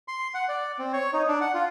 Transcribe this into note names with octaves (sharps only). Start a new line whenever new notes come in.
C6
F#5
D5
C4
C#5
D#4
D4
F#5
F4